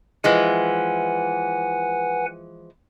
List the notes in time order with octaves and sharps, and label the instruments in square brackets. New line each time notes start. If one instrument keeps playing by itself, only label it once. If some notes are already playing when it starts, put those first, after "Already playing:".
[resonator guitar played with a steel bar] E3 F3 G#3 [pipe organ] B4 F#5 G#5